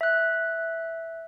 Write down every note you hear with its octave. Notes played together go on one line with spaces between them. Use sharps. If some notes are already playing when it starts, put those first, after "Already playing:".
E5 F#6